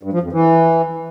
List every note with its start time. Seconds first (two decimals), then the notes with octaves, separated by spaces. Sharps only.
0.03 G2
0.13 F3
0.23 F2
0.33 E3